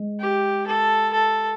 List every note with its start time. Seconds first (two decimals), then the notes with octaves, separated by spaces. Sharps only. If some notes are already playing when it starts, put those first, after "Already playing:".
Already playing: G#3
0.20 G4
0.67 A4
1.13 A4